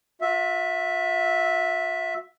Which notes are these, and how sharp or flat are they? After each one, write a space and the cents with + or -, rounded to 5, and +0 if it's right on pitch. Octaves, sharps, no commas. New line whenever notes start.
F4 +45 E5 +0